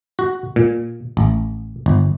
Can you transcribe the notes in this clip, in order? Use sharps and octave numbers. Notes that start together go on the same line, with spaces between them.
F#4
A#2
A1
G1